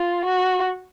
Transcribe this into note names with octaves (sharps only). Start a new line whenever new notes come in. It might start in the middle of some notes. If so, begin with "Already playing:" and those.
Already playing: F4
F#4